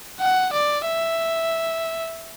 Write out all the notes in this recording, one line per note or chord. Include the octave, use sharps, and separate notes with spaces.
F#5
D5
E5